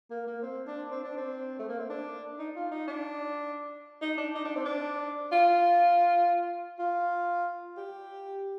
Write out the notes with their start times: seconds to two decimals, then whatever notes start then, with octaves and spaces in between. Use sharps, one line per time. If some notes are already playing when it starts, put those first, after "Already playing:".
0.11 A#3
0.27 A#3
0.42 C4
0.67 D4
0.91 C4
1.04 D4
1.17 C4
1.59 A3
1.69 A#3
1.79 C4
1.90 D4
2.39 D#4
2.56 F4
2.71 D#4
2.88 D4
4.02 D#4
4.18 D4
4.35 D#4
4.45 D4
4.56 C4
4.65 D4
5.32 F4
6.79 F4
7.77 G4